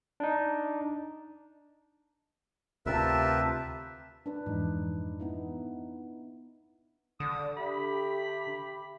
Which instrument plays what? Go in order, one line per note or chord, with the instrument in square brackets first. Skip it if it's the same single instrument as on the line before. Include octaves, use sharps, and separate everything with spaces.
[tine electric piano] D4 D#4
[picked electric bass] D2 C3 [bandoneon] F4 A#4 B4 [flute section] G4 A5 [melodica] E5
[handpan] D4 B4
[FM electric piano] F2 G#2 E3 [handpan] D#4
[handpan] B3 D#4 E4
[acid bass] D3 [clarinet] D#6
[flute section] G4 E5 [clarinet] B5